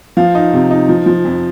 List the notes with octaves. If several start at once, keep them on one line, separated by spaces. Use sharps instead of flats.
F3 F5
D#4
C3
D#4
F3
F3
F2